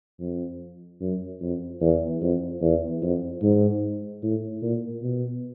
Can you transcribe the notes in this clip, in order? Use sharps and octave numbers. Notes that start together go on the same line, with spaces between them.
F2
F#2
F2
E2
F2
E2
F2
G#2
A2
A#2
B2